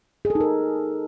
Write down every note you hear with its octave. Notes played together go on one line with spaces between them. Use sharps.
G#4
A4
D#4
A#4